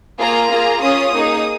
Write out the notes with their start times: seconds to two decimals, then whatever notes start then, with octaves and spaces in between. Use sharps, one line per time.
0.19 A#3 F4 G#4 A#5
0.50 A#3 F4 G#4
0.81 C#4 F4 G#4 D#6
1.14 A#3 D#4 G#4